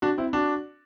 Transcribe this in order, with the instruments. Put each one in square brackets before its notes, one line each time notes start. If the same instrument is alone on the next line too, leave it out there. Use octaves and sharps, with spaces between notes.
[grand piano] D4 F#4
C4 E4
D4 F#4